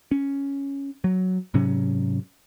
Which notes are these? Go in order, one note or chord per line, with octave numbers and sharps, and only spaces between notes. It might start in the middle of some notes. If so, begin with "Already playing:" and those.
C#4
F#3
G#2 C3 F#3 C#4